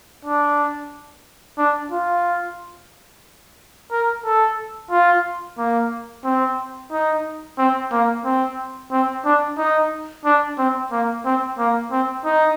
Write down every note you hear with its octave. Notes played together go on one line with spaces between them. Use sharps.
D4
D4
F4
A#4
A4
F4
A#3
C4
D#4
C4
A#3
C4
C4
D4
D#4
D4
C4
A#3
C4
A#3
C4
D#4